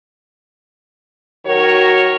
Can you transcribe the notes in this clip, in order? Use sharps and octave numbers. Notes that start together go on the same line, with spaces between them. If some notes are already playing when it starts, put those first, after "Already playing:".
D#3 F#3 F#4 A#4 C#5